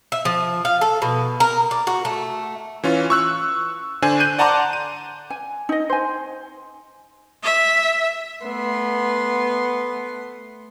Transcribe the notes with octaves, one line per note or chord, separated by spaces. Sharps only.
E5
F3
F5
A4
B2
A#4
D5
F#4
A3
E3 C#4 F4
C#6 E6 F#6
D3 D4 C5 G#5
F#6 G6 D#7
D5 F#5 A5 A#5 C6 D6
D#7
G#5
D#4 D#5
C5 G#5
E5
A3 B3 C6